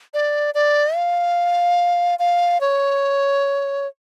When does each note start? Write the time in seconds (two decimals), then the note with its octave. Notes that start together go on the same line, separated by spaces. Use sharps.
0.14 D5
0.55 D5
0.96 F5
2.19 F5
2.61 C#5